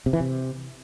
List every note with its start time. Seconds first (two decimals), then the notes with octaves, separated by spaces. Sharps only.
0.06 C3
0.13 E3
0.20 C3